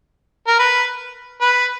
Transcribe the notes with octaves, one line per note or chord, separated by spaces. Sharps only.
A#4
B4
B4